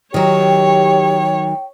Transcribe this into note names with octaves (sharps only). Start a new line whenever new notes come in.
D#3 F#3 G4 C#5 G5